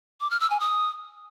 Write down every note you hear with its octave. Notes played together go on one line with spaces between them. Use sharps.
D6
F6
E6
G#5
D#6